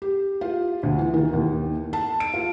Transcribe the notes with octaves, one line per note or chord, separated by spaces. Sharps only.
G4
F4
D2
E3
D#3
D#2
A5
D7
F4